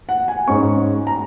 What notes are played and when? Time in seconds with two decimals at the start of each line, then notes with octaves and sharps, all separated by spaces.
0.09 F#5
0.28 G#5
0.48 G#2 G#3 C#4 C#6
1.07 A#5